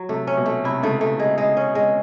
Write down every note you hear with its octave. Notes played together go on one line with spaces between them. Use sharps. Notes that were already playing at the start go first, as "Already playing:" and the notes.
Already playing: F#3
C3 A3
C#4
B2
A3
C3 E4
C#3 A3
C3 A3
G#3
G#3
C#4
G#3